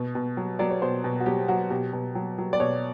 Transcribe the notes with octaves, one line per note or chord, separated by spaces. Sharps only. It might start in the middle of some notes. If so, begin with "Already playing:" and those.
Already playing: B2
B2
F#3
F#3 D5
C#5
B2 C5
B2
F#4
F#3 G4
F#3 F#4
B2 G4
B2
F#3
F#3
D5
B2 C#5